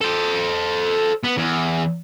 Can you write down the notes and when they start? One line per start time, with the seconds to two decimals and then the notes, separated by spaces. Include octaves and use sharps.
0.01 A4 C5
1.24 B3
1.37 E2